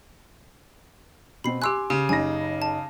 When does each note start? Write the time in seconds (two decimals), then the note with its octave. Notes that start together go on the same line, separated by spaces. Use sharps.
1.44 B2 C4 B5 C7
1.62 G4 G#5 C6 D6 E6 F#6
1.90 C#3 G4
2.09 F#1 D#4 G#5 A#6
2.62 A5